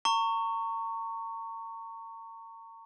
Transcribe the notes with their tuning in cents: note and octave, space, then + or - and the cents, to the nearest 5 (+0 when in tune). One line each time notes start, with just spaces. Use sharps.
A#5 -40 C#6 +5